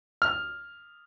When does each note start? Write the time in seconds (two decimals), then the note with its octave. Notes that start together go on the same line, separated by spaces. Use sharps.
0.22 F6